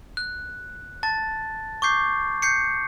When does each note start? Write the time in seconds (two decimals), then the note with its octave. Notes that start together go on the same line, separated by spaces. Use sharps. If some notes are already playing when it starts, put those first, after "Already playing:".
0.17 F#6
1.03 A5 A6
1.82 C#6 D6 G6 C7
2.42 G6 C7 C#7